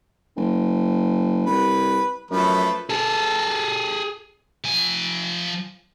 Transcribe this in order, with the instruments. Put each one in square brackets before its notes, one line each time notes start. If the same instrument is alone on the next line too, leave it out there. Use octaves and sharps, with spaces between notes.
[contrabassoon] F#1
[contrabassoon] C2 [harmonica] B4
[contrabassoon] F#2 [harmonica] F3 A3 B4
[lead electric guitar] G#4 A4
[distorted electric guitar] F3 G#5